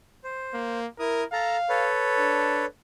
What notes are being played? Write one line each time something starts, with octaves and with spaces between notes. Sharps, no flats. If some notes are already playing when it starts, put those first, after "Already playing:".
C5
A#3
E4 A#4 D#6
A4 F5 A5 A#5
A4 B4 C#5
D4